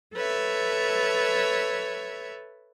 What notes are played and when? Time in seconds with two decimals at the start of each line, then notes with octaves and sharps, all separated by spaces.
0.14 A4 B4 C#5 E5